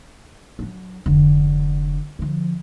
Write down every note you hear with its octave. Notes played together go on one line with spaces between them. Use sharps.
F#3 D4
F1 D3
D3 F3